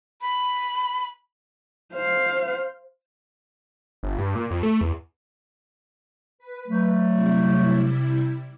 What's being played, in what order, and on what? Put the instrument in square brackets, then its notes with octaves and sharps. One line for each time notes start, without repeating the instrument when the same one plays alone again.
[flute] B5
[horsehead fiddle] C5 F5
[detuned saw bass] G1
G2
A#2
F2
A3
E2
[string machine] B4
[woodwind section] F#3 A3
[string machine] C3 G3 E4